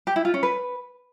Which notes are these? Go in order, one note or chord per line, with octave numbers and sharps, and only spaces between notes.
G4
E4
F4
C#4
B4